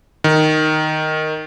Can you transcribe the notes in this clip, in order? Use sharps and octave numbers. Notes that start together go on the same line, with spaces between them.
D#3